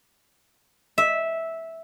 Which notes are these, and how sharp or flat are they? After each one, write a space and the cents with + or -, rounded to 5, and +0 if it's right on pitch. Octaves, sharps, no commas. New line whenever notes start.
E5 -10